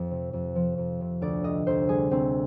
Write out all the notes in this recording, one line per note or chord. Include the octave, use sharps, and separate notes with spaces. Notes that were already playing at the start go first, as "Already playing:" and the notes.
Already playing: F2 F3
C3
F2
F3
F2
C3
D2 D5
C3 D#5
D2 C5
G3 G#4
D2 C4